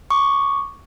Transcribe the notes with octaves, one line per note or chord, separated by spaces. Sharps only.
C#6 D6